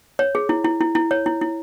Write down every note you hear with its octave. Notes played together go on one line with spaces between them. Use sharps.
C#5
G#4
E4
E4
E4
E4
C#5
E4
E4